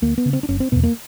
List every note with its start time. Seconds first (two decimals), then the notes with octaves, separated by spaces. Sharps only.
0.02 D2 A#3
0.18 B3
0.26 C#3
0.33 C4
0.43 D4
0.49 F#1 C#4
0.60 C4
0.72 E2 B2 B3
0.83 A#3